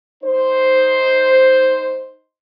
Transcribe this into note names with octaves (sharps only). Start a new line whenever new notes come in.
D#4 C5